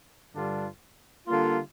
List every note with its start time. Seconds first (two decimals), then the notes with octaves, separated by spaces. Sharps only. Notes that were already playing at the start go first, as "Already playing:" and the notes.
0.35 G2 D3 G3 D4 F4
1.28 D3 G3 A#3 F4